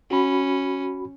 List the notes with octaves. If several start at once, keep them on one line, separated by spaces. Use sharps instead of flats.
C#4 F#4 B5